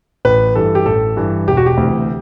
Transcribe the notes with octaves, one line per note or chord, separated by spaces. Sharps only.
A1 B4
G2 E3 A4
G4
A1 A4
G2 E3
E1 G4
F#4
G4
D2 C3 E3